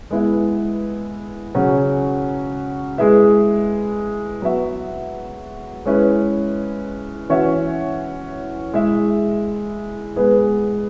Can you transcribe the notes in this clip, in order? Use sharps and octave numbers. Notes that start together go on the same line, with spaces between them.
G#3 B3 E4 B4 E5
C#3 F#3 C#4 F#4
G#3 E4 G#4 B4 E5
F#3 B3 F#4 E5
G#3 C#4 E4 B4
E3 C#4 F#4 C#5 E5
G#3 E4 G#4 E5
G#3 B3 G#4 B4